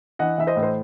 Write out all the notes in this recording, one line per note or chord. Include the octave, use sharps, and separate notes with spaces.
E3 D#5 F#5
E3 E5
C5 D#5
A2
C5